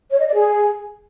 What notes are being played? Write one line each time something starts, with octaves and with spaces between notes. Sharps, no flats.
C#5
D#5
D5
G#4